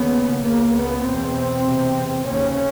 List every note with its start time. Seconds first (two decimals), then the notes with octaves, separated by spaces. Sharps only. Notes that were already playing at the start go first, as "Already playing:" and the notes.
Already playing: D#2 C#3 B3
0.44 C#2 C#3 A#3
0.75 B3
1.04 E2 B2 C4
1.65 E2 C3
2.24 D#2 C#3 C#4